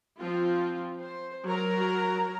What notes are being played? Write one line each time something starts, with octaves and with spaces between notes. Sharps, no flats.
F3 C4 F4
C5
F#3 F#4 A#4 A#5